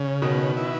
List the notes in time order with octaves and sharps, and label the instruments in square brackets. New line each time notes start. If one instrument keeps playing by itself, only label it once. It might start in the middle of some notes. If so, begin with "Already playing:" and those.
Already playing: [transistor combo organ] C#3
[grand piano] B2 D#3 [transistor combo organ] B3
[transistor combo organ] E4